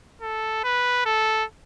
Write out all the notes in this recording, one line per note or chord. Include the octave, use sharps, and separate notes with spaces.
A4
B4
A4